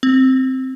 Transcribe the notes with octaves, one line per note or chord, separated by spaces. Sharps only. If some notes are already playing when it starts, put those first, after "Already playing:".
C4